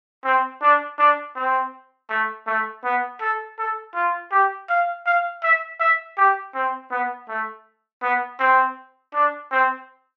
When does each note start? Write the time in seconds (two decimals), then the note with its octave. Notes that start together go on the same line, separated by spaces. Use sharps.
0.25 C4
0.62 D4
0.99 D4
1.36 C4
2.10 A3
2.47 A3
2.84 B3
3.21 A4
3.59 A4
3.95 F4
4.32 G4
4.69 F5
5.06 F5
5.43 E5
5.80 E5
6.18 G4
6.55 C4
6.91 B3
7.29 A3
8.03 B3
8.40 C4
9.14 D4
9.51 C4